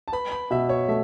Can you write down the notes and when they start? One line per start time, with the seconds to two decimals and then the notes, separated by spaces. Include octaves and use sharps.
0.08 A5
0.12 B4 B5
0.32 B5
0.50 B2 E5
0.69 C#5
0.88 A3 E5